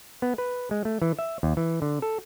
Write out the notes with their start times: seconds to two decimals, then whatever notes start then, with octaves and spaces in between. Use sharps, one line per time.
0.22 B3
0.38 B4
0.71 G#3
0.85 A3
1.02 E3
1.19 E5
1.43 D#2
1.57 E3
1.82 D3
2.02 A4